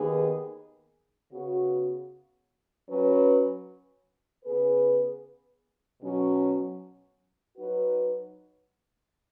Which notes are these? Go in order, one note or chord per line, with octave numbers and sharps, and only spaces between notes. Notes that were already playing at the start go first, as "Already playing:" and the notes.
Already playing: D#2 D#3 B3 G#4 B4
C#3 B3 F#4
F#3 C#4 B4
C#3 B3 G#4 B4
B2 F#3 C#4
F#3 D#4 F#4 B4